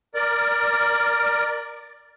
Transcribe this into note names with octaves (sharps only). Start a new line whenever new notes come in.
A#4 D5